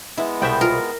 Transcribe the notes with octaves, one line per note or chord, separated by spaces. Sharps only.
G#3 B3 E4
C2 B2 B4 C5 E5 G5
F4 A#4